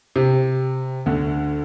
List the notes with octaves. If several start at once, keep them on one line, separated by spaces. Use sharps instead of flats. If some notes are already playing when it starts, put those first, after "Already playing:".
C3
D2 D3